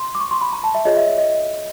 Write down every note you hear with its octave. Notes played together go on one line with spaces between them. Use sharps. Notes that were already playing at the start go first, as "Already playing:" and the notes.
Already playing: C6
D6
C#6
C6
B5
A#5
A5
E5
F4 G#4 C#5 D#5
E5
E5
D#5